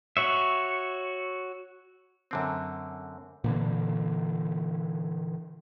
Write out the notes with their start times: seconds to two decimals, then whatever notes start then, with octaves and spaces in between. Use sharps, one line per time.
0.17 F#4 C#5 E5
2.31 F#2 D3 C4
3.44 A#2 D3 E3